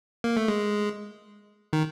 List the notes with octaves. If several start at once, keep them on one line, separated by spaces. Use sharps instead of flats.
A#3
A3
G#3
D#3